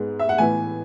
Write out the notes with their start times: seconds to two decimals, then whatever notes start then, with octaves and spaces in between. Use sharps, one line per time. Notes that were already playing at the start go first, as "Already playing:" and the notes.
Already playing: G#2 G#3 B3
0.19 E5
0.29 F#5
0.38 A2 E3 B3 G#5